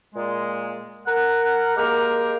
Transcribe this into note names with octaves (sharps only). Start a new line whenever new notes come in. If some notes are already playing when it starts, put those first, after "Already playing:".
A#2 G#3
A#4 F#5
G#3 A#3 G4 A#4